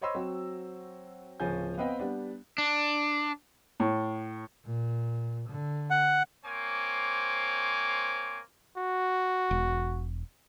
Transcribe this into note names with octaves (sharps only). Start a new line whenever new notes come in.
C5 C#5 D#5 B5 C6 E6
F#3 C4 F#4
D1 C#3 F3 C#4 G#5 G6
B3 C4 B4 D#5 F5 G5
G3 B3 D4
D4
A2
A#2
D3
F#5
A#3 C4 C5 C#5 G#5 D6
F#4
E1